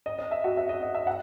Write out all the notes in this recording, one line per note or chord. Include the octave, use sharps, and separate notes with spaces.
D#5
D#5
E5
F#4 F#5
E5
D#5
D#5
E5
F#5